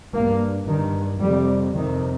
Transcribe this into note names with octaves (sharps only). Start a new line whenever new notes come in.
G2 A#3
G2 D#3
F2 C3 G3
F2 C3 D#3